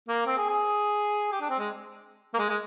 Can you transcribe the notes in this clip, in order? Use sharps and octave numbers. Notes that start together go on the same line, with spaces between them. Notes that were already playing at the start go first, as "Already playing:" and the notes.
A#3
C4
G#4
G#4
G4
D4
C4
G#3
A#3
G#3
G#3